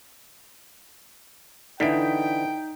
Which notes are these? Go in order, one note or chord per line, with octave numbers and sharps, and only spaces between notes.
D3 E3 D#4 G5 B6 D7